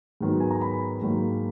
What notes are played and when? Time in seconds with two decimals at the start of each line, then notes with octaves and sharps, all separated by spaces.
0.21 G#2 D#3 F#3 B3
0.40 G#5
0.51 A#5
0.61 B5
1.02 G#2 D#3 F#3 A#3